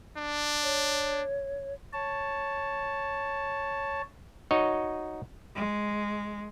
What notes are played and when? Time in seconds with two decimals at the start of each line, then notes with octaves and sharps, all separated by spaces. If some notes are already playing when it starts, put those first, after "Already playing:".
0.17 D4
0.63 C#5
1.93 C#5 A5
4.51 D#4 F#4 C#5 D#5
5.55 G#3